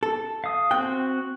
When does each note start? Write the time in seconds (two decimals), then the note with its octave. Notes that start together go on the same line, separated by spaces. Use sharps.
0.03 A4
0.44 F5 D#6
0.71 C4 F#4 G5 F#6